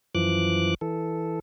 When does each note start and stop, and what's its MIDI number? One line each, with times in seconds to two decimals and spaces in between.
0.15 0.74 42
0.15 0.74 52
0.15 0.74 53
0.15 0.74 86
0.15 0.74 90
0.81 1.39 52
0.81 1.39 69